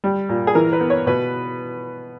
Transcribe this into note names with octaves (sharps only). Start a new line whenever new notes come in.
G3
A#2
G#4
E3 A#4
B4
B3
C#5
B2 B4